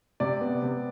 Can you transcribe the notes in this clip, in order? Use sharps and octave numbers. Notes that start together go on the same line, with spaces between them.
C3 D5
B3
C3